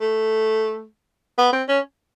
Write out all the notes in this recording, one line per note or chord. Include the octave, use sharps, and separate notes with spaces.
A3
B3
C4
C#4